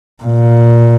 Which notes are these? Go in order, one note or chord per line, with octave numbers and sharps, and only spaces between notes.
A#2